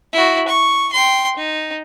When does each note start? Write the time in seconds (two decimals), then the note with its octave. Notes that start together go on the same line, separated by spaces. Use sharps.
0.13 E4 F#4
0.48 C#6
0.92 G5 C6
1.37 D#4